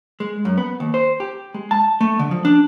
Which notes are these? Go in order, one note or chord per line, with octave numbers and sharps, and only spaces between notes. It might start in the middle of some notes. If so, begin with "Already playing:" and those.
G#3
F#2
B3
D#2
C5
G4
G#3
A5
A3
D3
F3
D4